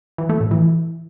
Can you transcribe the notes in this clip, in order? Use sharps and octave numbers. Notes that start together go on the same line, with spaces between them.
E3
A3
A2
E3